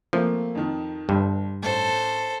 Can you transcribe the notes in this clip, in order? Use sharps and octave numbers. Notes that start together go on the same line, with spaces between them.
F3 A3 A#3 C4
F2 D#3
G1 G2
A1 A4 C5